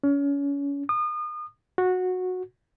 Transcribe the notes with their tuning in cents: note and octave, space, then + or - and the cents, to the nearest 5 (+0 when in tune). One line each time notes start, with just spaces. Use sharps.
C#4 +30
D#6 -35
F#4 -15